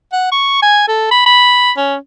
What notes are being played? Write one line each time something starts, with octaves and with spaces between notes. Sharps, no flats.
F#5
C#6
G#5
A4
B5
B5
C#4